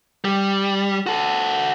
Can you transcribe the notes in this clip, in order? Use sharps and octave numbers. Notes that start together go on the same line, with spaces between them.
G3
F#4 A4